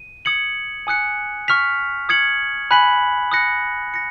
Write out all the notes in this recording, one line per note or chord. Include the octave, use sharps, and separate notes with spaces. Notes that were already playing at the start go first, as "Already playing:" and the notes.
Already playing: D#7
D#6 G#6 C#7 F#7
G#5 D#6 F#6 C#7
C#6 F6 B6 F7
D#6 G#6 C#7 F#7
G#5 B5 F#6 B6 F#7
D#6 F#6 A#6 C#7
A#6 C#7